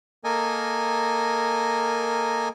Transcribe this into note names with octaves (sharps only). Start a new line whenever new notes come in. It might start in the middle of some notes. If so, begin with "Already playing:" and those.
A#3 A4 A#4 D#5 G#5